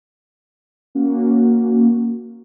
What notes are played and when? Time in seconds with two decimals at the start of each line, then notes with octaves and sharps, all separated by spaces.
0.95 A#3 C#4 F#4